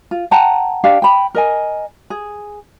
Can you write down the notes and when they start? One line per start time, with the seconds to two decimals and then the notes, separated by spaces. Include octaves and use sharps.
0.11 F4
0.31 F#5 G5 A5 A#5
0.84 D4 G4 F5
1.02 G5 B5
1.35 A#4 D#5 G#5
2.10 G#4